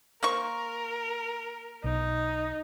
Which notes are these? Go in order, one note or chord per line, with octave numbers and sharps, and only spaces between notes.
A#3 A#4 C5 C#6
B1 D#4